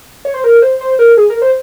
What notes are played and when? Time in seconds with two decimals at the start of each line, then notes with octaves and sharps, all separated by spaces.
0.25 C#5
0.34 C5
0.44 A#4
0.62 C5
0.81 C5
0.99 A#4
1.17 G#4
1.30 A#4
1.42 C5